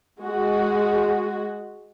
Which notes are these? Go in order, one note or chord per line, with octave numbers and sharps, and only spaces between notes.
G#3 F#4